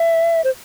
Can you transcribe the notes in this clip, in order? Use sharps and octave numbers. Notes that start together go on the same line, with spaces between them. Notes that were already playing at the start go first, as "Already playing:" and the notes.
Already playing: E5
C5